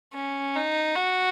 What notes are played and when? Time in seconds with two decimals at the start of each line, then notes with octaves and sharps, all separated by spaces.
0.15 C#4
0.56 D#4
0.96 F#4